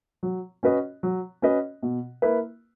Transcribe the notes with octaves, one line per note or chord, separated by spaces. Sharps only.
F#3
C#4 F#4 B4 D#5
F#3
C#4 F#4 B4 D#5
B2
A#3 E4 B4